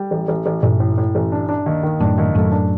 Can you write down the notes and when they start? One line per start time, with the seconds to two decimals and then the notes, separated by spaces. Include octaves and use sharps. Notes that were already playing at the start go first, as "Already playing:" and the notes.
Already playing: G3
0.11 A1
0.28 A1
0.46 A1
0.63 A1 G2 A#2
0.80 A2
0.98 A2
1.15 A1
1.32 D4
1.49 D4
1.66 D#2
1.83 D#3
2.00 F#2 A2 D4
2.18 D#2
2.35 F#2 A2 A3
2.52 D4